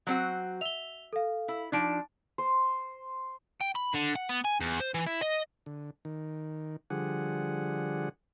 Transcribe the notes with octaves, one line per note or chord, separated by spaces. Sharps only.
F#3 C4 F#4
E5 F7 G7
A4 F5
E4
F3 D4 D#4 D7
C5
G5
B5
D3
F#5
B3
G#5
E2
C5
E3
E4
D#5
D3
D#3
D3 F3 G3 G#4 F#5